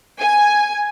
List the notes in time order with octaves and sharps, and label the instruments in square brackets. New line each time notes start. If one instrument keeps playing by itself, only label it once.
[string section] G#5